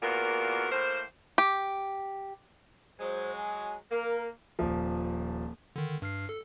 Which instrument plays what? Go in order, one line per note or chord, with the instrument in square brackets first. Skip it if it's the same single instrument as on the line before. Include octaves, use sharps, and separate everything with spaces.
[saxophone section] E2 A#2 A#3 B3 F#4 A#4
A2 A#3 C5
[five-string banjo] G4
[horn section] F#3 G#3 [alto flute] C5
[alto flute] G#5
[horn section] A#3 [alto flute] A#4
[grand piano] D#1 F3
[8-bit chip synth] D3 D#3
G2 F6 C7
A4